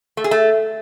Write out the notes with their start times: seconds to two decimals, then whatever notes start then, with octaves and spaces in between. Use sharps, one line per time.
0.17 A3
0.24 G#4
0.31 A3